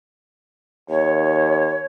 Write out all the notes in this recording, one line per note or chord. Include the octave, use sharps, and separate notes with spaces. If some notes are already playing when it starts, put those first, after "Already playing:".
D#2 C#5